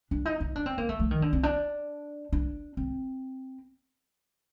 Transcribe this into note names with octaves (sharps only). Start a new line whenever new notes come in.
D4
D#4
D#4
D4
C4
A#3
A3
F3
D#3
D3
C4
D4
D4
C4